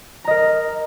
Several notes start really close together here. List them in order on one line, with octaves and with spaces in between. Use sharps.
A#5 D#5 A#4